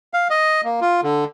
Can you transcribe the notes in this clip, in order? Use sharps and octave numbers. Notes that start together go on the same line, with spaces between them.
F5
D#5
A#3
F4
D3